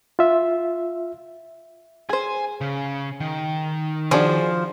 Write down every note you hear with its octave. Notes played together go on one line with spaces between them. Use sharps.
F4 E5
G#4 C5 G#5
C#3
D#3
F3 D4 F#4 G#4